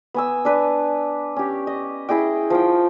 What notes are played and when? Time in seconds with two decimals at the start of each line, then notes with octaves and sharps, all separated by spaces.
0.14 B3 G#5 E6
0.45 D4 B4
1.36 C#4 G4
1.67 D#5
2.09 E4 G#4 D#5 G5
2.50 F3 A#4 G5